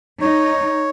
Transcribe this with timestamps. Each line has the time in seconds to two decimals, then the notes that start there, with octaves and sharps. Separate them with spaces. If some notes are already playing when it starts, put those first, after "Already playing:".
0.21 D#4 C#5